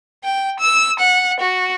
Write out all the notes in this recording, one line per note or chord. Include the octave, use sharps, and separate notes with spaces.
G5
E6
F#5
F#4